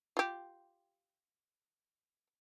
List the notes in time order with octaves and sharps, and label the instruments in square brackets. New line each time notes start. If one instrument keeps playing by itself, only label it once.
[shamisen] F4 G4